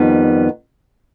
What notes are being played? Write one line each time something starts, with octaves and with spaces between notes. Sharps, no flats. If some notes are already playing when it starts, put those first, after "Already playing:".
Already playing: F2 D#3 G3 B3